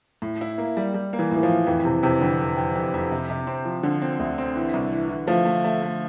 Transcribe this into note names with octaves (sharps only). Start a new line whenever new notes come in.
A2
E4
A#3
G3
G3
A#3
E3
A2 E3
F3
A2
F2 E3
C3 E3
F2 C3
F2 D3
F2
F2
F2
F2
C3
C3
C4
F3
D3 F3
C4
D2
C4
E3
C2
E3
E3
F3 A3
A3
A3
A3